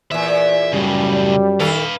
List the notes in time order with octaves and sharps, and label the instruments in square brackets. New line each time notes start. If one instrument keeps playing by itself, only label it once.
[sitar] E2 A#2 [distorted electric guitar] E5
[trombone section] F#2 G3 [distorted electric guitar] A2 C#3
[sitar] D#3 A4 [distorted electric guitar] B4 F5